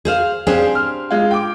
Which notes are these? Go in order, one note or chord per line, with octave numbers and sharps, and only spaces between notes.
G#4 C5 F5
C4 D4 G4 G#4 C5 F5
F6
G#3 F4
G5 D6